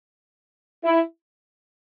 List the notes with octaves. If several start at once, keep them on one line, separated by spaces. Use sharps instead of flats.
E4